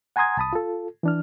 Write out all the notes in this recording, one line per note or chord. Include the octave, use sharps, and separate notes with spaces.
F#5 G#5 A#5 C6 D#6 G#6
C2 A5 B5 D#6
F4 A4
E3 D4 F6